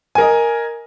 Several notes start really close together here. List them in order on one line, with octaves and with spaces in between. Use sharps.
G#5 A#4 D#5